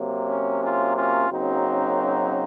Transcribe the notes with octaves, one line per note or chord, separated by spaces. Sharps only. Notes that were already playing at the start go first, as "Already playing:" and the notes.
Already playing: C3 F#3 A#3
C#4
C#4 F4
C#4 F4
F#2 C#3 F#3 A#3 C4 D#4